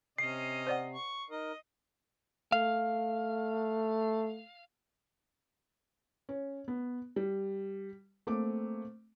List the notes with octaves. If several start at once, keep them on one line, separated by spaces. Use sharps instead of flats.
C3 C#4 D#5 C7
C5 D5 F#5
C#6
D#4 A#4 D#5
A3 F5
C#4
B3
G3
A3 A#3 C4 D6